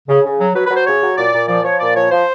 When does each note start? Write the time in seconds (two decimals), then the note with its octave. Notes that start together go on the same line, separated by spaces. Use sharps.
0.08 C#3
0.24 C#3
0.40 F#3
0.54 F#3 B4
0.65 B4
0.70 F#3
0.76 C5
0.86 C#3 C#5
1.02 F#3
1.17 A#2 D5
1.33 A#2
1.48 F3 D5
1.64 F3 C#5
1.79 A#2 D5
1.95 F3 C#5
2.11 F3 C5